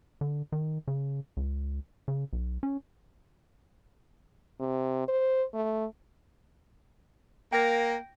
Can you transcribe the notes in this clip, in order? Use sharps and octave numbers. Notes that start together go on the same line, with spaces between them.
D3
D#3
C#3
C#2
C#3
B1
C#4
C3
C5
A3
A#3 G5 A#6